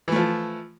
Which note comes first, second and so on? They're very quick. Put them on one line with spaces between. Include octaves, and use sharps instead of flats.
E3 A3 F3